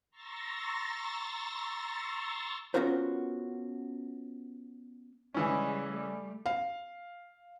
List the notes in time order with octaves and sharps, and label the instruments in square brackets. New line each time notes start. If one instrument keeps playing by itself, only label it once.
[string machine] A#5 C6 C#6 E6 A6 A#6
[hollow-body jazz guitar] B3 C#4 F4 F#4 A#4 C5
[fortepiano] C#3 E3 C#4 [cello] G3 G#3
[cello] G3 A3
[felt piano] F5